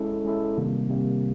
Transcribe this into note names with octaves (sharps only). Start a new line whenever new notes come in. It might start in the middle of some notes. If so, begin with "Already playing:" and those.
Already playing: G#3 C#4 E4 A4
G#3 C#4 E4 A4
C3 D#3 G3 A#3
C3 D#3 G3 A#3